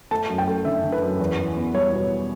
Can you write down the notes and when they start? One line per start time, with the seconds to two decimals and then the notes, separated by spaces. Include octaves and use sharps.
0.11 A3 A5
0.29 F#2
0.38 G5
0.48 A3
0.65 D3 E5
0.84 D3
0.92 B4
1.02 F#2
1.19 E2
1.39 E2
1.56 B3
1.74 G3 C#5
1.92 B2